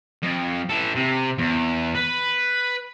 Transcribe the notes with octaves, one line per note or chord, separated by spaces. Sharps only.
F2
E3 A4
C3
E2
B4